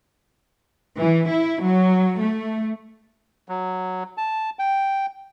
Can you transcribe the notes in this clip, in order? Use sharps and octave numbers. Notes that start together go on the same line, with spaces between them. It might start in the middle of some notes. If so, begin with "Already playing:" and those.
E3
E4
F#3
A3
F#3
A5
G5